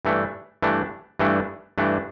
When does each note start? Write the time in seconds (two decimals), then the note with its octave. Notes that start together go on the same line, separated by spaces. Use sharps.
0.05 G2 E3 A3 D4
0.62 G2 E3 A3 D4
1.19 G2 E3 A3 D4
1.78 G2 E3 A3 D4